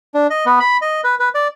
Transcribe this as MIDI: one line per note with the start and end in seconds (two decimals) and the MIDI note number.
0.14 0.27 62
0.30 0.45 75
0.46 0.59 59
0.60 0.77 83
0.81 1.01 75
1.04 1.15 71
1.20 1.29 71
1.35 1.48 74